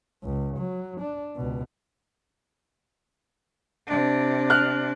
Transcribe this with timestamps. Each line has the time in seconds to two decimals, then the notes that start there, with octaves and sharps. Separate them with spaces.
0.23 C#2
0.57 F#3
1.01 D4
1.36 C#2 B2
3.87 C3 D4
4.50 F6 F#6